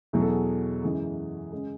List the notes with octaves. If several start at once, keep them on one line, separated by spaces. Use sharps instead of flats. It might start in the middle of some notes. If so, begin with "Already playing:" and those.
E2 B2 F#3 G#4
A4
G#4
F#2 E3 G#3
C#3 G#3